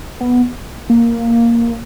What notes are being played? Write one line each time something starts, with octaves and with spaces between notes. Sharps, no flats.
B3
A#3